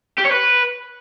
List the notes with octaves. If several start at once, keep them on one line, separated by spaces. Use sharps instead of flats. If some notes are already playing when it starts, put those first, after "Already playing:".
G4
C#5
B4